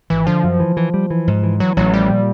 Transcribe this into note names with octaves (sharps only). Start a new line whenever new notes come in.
G#1 E3
D3 F3
F#2
E3
E3
G3
E3
G#2
E3
E3 F#3
A1 F#3
F3 G3
A#2